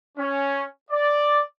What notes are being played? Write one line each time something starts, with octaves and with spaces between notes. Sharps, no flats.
C#4
D5